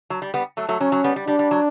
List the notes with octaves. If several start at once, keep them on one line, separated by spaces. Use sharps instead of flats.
F#3
G3
G3 B3
F#3 A3
F#3 A3
F#3 C#4
F#3
G3 B3
G3
G3 D4
G3
F#3